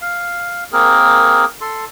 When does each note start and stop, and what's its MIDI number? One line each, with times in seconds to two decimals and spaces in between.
0.02 0.64 77
0.72 1.45 58
0.72 1.45 60
0.72 1.45 68
0.72 1.45 70
1.61 1.85 69
1.61 1.85 84